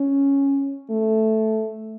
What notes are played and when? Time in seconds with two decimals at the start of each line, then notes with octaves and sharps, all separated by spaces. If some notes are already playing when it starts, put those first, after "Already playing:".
Already playing: C#4
0.90 A3